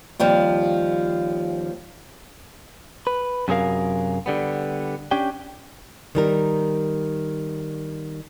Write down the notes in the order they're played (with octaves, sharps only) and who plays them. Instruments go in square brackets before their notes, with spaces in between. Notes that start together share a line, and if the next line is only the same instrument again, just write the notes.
[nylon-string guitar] D#2 F3 G3 C4
[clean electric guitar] B4
F#2 C3 F#3 G#4 A#4 F5
D3 G3 B3
C#4 D4 G4 G5
[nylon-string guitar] D#3 G3 A#4